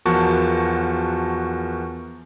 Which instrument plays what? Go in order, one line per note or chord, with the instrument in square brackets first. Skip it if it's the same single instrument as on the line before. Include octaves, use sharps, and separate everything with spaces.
[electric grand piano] E2 F3 F#4 A#4 A5 C#6